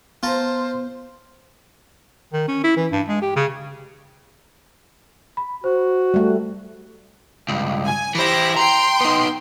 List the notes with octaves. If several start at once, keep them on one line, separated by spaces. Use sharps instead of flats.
B3 F4 C5 A5 A#5
D#3
C#4
E4
E3
G2
G#3
G4
C#3
B5
F#4 C5
G3 A3
C#2 G2
G#5
E3 E4 G4 C5 A#6
G5 A#5 C6
B3 D#4